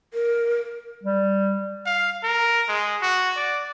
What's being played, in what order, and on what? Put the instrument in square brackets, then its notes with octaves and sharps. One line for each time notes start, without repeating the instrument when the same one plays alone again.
[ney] A#4
[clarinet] G3
[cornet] F5
A#4
G#3
F#4
D5